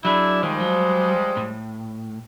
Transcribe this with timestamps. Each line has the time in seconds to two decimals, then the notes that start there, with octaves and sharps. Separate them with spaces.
0.05 F#3 D4 E4 G#4
0.43 D#3 F3 G3 G#3
0.60 F#3
1.37 A2